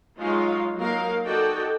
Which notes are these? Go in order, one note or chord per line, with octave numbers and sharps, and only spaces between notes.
F#3 G#3 D#4 F4 C#5 F5
F#3 A#3 D#4 A#4 F5
D#4 F#4 A4 D5 G5